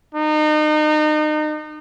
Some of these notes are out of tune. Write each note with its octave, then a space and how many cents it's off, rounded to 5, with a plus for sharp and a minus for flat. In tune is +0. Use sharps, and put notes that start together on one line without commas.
D#4 -35